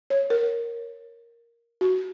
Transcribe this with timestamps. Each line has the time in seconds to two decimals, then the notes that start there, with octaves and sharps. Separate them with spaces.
0.10 C#5
0.30 A#4
1.81 F#4